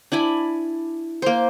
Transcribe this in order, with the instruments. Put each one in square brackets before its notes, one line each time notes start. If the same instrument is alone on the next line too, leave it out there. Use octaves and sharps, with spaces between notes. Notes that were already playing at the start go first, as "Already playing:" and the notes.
[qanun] D4 E4 G#5 B5
A#3 C5